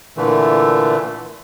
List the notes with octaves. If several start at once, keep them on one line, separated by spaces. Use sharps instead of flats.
A#2 D3 E3 A3